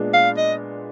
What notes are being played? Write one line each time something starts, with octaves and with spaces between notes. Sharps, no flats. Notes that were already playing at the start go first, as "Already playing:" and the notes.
Already playing: A#2 G#3 B3 D4
F5
D#5